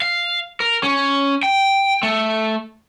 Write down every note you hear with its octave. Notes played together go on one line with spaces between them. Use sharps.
F5
A#4
C#4
G5
A3